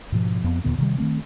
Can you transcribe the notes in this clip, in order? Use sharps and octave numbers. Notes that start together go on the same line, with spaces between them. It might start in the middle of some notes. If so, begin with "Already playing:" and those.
G#2 B2 F3
F2 B3
D#2 A#2 D3 B3
C3 D#3 G3
D#3 F3 A3 C4